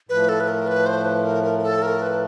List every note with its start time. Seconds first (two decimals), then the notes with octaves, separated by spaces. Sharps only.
0.09 A2 F3 A3 B4
0.29 A4
0.40 B4
0.48 A#4
0.67 B4
0.86 C5
1.05 B4
1.24 A#4
1.44 A#4
1.59 A#4
1.63 A4
1.82 A#4
2.02 B4